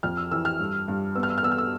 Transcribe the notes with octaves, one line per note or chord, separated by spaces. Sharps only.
F2 F6
E6
E3 E6
F6
G2
G2
B3 E6
F6
E6
F6
B3 E6
F6
E6